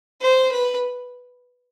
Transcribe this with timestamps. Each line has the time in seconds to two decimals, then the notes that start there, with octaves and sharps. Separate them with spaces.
0.21 C5
0.52 B4